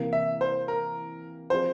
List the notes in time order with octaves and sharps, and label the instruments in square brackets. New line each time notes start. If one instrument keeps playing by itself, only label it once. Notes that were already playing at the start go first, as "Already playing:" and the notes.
Already playing: [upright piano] C3 E3 A#3
[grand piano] E5
C5
A#4
[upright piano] F3 C4 F4 G#4 [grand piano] C5